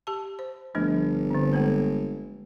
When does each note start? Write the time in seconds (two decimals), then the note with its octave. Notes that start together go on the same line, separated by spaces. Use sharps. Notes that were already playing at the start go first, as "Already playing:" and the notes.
0.07 G4 A5
0.39 C5
0.75 G1 F3 A3 D4
1.30 D3 C4
1.53 G#3 A#3 A4